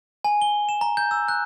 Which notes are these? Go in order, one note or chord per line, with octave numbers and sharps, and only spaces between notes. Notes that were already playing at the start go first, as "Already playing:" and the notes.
G#5
G7
E7
A#5
G6
E6
F#6